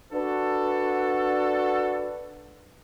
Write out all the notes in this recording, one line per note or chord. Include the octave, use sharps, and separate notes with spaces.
D4 F#4 A4 B4